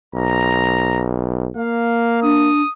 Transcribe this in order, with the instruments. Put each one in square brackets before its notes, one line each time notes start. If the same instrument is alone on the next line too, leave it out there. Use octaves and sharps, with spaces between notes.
[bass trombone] B1 [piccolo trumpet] A#5
[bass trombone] A#3 [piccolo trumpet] F5
[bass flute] D4 [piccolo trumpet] D#6